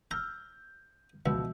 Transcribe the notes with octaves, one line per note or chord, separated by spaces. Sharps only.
A#5 E6 F6 G6
C#2 B2 D3 E3 F3 B3 F#4 E6